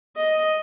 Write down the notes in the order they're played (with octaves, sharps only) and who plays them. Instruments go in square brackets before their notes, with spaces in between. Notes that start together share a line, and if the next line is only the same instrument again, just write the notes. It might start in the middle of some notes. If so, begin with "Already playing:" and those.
[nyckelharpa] D#5